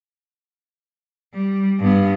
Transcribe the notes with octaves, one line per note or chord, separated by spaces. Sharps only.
G3
G2 B3